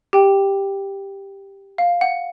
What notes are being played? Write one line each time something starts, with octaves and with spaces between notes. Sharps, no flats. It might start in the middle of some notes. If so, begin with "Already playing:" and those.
G4 G5
F5
F#5